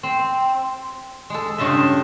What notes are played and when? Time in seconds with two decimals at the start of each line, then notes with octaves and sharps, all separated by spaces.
0.03 C4
1.30 G#3 A4
1.58 G2 C#3 F4 D#5 E5